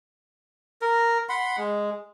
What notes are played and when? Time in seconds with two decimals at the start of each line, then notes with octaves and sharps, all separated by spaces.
0.82 A#4
1.29 F#5 B5 C6
1.57 G#3